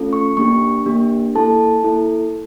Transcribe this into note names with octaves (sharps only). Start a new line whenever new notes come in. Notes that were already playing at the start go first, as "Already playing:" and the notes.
Already playing: A3 C#4 F4 A4
C#6
A#3 D4 G4 C#6
A#3 D4 G4
A#3 E4 A4 A5
A#3 E4 A4